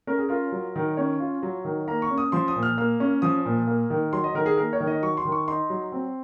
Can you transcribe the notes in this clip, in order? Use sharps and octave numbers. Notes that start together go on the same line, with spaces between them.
C#4 A#4
G#4
F4 A#4
F#3
D#3
C#4 C#5
F4
F#3
D#3
A#3 A#5
C#6
C#4
D#6
F3 C6
D#6
A#2
F6
A#3 F6
C#4
F3 D#6
A#2
A#3
D#3
F#3 C6
D#5
D#3 A#4
G#4
A#3 A#4
C#5
D#3
D#5
F#3 C#6
C6
D#3
C#6
D#4 C6
F#3
C4